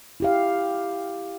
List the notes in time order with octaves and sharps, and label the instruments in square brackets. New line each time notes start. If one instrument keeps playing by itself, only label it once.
[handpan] E4 G4 F5